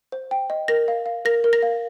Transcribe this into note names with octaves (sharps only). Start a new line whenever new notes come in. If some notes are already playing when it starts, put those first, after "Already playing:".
C5
G5
D#5
A#4 A#6
F5
F5
A#4 A#6
A#4
A#6
F5